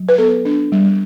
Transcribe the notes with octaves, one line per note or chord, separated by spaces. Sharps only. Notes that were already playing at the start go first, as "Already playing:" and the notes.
Already playing: F#3
B4
B3 A4
D4
G3